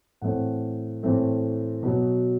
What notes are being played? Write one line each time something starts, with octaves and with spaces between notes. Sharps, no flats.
A2 E3 A3 C4 F#5
A2 E3 A3 C4
B2 F#3 B3